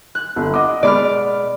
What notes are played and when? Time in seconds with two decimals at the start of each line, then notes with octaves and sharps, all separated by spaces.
0.15 F#6
0.36 G1
0.54 D#5 F#5 D6
0.83 B2 G#3 D5 B5 D6 F6